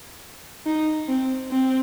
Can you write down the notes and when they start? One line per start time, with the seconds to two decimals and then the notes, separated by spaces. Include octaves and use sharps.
0.66 D#4
1.09 C4
1.52 C4